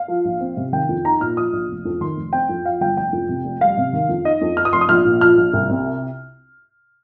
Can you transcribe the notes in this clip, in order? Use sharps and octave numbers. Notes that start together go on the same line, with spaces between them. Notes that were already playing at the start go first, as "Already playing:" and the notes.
Already playing: F5
F3
A#1
C4
C3
D#3 G5
F2
D#4 A#5
A#2 F6
F3 D#6
A#1
F1
F2
D#3 C6
F1
C4 G5
F2
F3 F5
G1 G5
F1 G5
F2
C3
F1
G3 F5
C3
D#3
F2
D#4 D#5
F2
F3 F6
D#6
F1 C6
D#6
A#1 F6
A#2
F3 F6
A#1
C2
C3